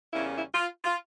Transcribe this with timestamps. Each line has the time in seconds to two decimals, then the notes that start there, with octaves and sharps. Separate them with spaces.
0.12 E2 C#3 G3 A#3 C#4 E4
0.36 E4
0.53 F4
0.85 F4